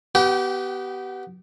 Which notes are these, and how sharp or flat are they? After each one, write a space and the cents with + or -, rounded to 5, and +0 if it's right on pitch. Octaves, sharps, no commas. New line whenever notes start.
B3 +0 G4 -25 G5 -35